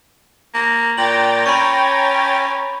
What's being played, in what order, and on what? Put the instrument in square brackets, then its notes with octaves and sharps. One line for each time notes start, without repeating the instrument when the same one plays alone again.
[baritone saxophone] A#3
[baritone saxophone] A#2 [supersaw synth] G5 A#5 A6 [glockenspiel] F#7
[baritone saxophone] C#4 [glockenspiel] B5 C#6